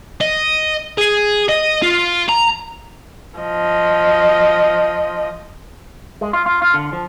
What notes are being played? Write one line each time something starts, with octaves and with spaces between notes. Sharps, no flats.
D#5
G#4
D#5
F4
A#5
F3 D#5
G#3
F4
F4
F4
D3
F3